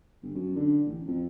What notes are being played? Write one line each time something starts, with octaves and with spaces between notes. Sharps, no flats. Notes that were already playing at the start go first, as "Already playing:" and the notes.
G1
F#2
D3
A1
F2